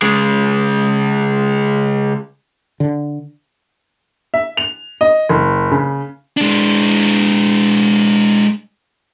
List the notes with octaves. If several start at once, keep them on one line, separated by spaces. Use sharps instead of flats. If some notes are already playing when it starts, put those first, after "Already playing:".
C#3 G#3
D3
E5
F7
D#5
F#1
C#3
G#3 D4